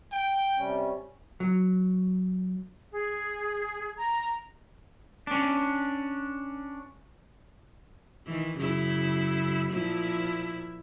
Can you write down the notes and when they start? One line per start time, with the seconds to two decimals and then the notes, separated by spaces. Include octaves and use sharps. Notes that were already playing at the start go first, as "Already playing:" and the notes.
0.12 G5
0.57 C3 G3 C#4
1.40 F#3
2.91 G#4
3.97 A#5
5.27 C#4 D4
8.26 D#3 E3
8.58 F#2 C#3 E4
9.71 A#2 F3 E4